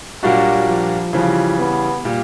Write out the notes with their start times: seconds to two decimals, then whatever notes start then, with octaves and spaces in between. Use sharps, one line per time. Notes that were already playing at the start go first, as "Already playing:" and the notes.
0.23 A#2 F#3 G3 A#3 D4 F#4
0.68 F3
1.13 C#3 E3 F3 G3
1.59 B3
2.05 A#2 G3